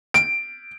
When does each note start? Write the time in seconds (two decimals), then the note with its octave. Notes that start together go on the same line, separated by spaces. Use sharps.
0.14 D7